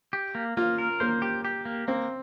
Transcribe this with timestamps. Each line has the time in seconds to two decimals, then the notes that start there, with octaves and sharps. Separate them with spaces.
0.13 G4
0.35 A#3
0.57 A#3 F4
0.78 A#4
1.00 A#3 C5
1.22 G4
1.45 G4
1.65 A#3
1.88 A#3 C4